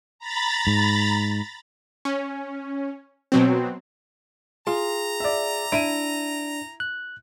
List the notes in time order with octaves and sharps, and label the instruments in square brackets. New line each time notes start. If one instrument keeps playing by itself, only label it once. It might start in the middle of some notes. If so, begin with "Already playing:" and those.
[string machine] A#5 B5 A6
[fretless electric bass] G#2
[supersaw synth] C#4
B2 F#3 C4
[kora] F4 [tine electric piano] G#4 [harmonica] A#5
[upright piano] D5 E5
[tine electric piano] D4 [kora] E4 [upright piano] D7 D#7
[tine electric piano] F#6